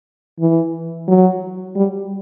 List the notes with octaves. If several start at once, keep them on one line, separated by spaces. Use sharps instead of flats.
E3
F#3
G3